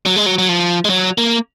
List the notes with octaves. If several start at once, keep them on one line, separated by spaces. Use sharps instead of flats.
F#3
G#3
F#3
F#3
F3
G#3
F#3
A#3